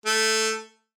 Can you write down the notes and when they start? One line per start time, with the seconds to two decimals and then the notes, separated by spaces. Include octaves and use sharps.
0.06 A3